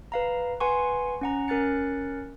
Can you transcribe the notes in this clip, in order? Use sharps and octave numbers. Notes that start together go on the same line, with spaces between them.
B4 F5 A#5
B4 F#5 G#5 C6 C#6
C#4 F#5 A#5
C#4 A#4 F#6 A6 C#7